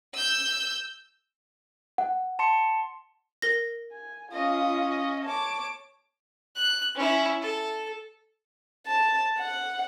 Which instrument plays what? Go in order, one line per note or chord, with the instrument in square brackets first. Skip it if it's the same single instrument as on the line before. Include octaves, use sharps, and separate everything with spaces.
[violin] E6 G6
[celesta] F#5
[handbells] A5 C6 C#7
[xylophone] A#4 A#6
[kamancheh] G#5
[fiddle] C#4 D#5 [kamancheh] F4
[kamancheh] C#5 [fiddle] A5 D6
[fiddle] F#6
C#4 E4
A4
[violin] A5
F#5